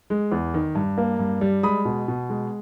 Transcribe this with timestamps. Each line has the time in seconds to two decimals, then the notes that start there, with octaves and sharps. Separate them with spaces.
0.10 G#3
0.32 E2
0.54 D#3
0.75 G2
0.98 A#3
1.19 G2
1.41 G3
1.63 G#3 B5 D#6
1.85 B2
2.08 B2
2.29 G#3